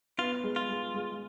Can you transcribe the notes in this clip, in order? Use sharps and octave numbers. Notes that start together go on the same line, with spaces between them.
B3 F4
G#3
F4
G#3
G#3